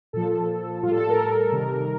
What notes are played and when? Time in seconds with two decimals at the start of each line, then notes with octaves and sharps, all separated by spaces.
0.13 A#2 F3 A4
0.83 A2 F4
0.86 G3 A4
1.00 A4
1.10 A#4
1.52 C3 D#3 G3